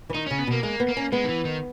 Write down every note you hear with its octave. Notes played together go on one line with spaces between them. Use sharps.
E3
D#3 D#4
C#3 C#4
B3
B2 A#3
G#3 A#3
B3
A#3
C#4
G#3 B3
D#3
E3
D#3